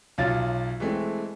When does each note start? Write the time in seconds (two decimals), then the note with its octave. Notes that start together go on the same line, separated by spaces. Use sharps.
0.18 B1 F#3 F4 F5 A6
0.80 E3 G#3 A3 C4